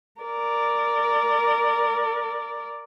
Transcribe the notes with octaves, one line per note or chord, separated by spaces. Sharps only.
A#4 D5